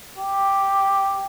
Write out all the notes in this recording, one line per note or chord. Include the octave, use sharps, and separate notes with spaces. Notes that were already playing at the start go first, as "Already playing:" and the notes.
G4